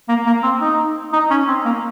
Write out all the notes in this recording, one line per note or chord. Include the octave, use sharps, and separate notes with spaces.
A#3
A#3
C4
D#4
D#4
C#4
C4
A#3